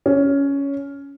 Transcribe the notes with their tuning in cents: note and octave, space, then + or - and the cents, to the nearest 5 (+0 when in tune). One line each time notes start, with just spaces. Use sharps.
C#4 +10